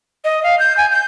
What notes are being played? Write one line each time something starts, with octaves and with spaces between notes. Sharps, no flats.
D#5
F5
G6
G#5
G6